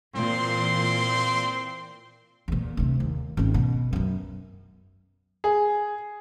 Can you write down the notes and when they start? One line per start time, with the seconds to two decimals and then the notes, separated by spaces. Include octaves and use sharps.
0.16 A#2 E3 C4 C6
2.48 E2 A#2
2.77 D2 C3
3.00 D#2
3.37 G#1 C#4
3.54 B2
3.93 F#2 B3
5.44 G#4